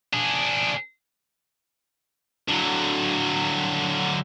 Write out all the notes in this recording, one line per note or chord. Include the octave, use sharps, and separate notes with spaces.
D4 G#4
D3 F#3